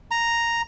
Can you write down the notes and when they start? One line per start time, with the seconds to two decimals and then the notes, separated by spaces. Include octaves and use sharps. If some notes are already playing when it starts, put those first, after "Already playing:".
0.11 A#5